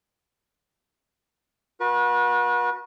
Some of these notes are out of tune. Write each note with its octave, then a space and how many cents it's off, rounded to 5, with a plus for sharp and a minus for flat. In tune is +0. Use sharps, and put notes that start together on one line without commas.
F#4 -30 B4 -40